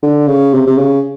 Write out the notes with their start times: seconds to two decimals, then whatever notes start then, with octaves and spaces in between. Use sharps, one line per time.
0.03 D3
0.28 C#3
0.54 C3
0.67 C3
0.78 C#3